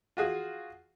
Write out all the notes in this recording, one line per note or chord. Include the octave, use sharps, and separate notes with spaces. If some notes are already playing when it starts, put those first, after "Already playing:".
F4 F#4 G#4